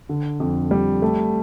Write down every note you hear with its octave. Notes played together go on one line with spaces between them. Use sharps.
D3
F2
G3
A3